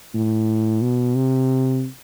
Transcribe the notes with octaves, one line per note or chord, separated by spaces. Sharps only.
A2
B2
C3